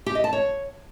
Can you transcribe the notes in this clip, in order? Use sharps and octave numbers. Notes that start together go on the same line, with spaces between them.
G4
D#5
A5
C#5